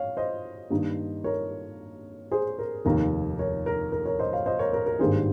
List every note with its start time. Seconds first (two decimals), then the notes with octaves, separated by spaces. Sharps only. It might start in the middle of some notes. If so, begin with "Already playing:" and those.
Already playing: C#5 F5
0.17 C5 D#5
0.70 G2 D#3 A#3
1.24 A#4 C#5
2.31 G#4 C5
2.59 A#4
2.85 F1 D#2 D#3 A#3 A#4
3.39 A#4 C#5
3.66 A#4
3.92 A#4
4.06 A#4 C#5
4.19 C5 D#5
4.33 C#5 F5
4.46 C5 D#5
4.59 A#4 C#5
4.73 A#4
4.86 A#4
4.99 G#1 G2 D#3 G3 A#3 G#4 C5